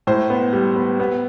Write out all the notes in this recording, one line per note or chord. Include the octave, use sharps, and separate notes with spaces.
A2 C5
B3
G3
B3
B3